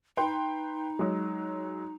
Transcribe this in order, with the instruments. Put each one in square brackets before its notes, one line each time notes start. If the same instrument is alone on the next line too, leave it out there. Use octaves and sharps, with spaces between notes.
[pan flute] D#4 [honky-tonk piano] B4 G5 C6
[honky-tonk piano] F#3 G#3